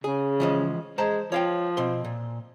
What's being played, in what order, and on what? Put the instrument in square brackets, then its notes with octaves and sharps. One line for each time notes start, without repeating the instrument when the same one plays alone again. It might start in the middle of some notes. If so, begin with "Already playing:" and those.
[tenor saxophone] C#3 [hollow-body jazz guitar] G#4
[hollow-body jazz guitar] E3 F3 G#3
[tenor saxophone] G#3 [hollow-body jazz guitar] C5 A5 A#5
[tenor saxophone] F3 [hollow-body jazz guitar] C#5 F5 G5
[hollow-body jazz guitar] B2 C4 C6
A#2